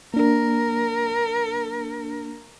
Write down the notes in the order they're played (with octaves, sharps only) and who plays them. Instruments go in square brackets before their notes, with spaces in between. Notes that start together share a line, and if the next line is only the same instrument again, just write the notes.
[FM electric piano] A#3 D4 [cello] A#4